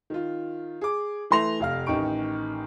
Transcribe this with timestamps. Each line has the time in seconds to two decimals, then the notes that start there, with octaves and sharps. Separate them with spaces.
0.10 D#3 F4
0.81 G#4 D6
1.30 E3 A3 C6 A#6 F7
1.60 F1 F5 F6
1.86 A1 D#3 D#4 G4 C#6 D7